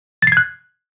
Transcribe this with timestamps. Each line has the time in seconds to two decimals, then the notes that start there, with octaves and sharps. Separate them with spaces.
0.22 A6
0.27 C7
0.32 G#6
0.37 F#6